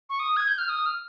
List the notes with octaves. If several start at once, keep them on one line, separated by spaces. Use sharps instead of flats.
C#6
D#6
G#6
G6
F6
D#6
F6